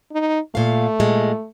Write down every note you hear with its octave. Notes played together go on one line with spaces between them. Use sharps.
D#4
A#2 A3 F5
A#2 G#3